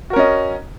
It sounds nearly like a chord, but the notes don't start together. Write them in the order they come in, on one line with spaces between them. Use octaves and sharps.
F#4 A#4 C#4 D#5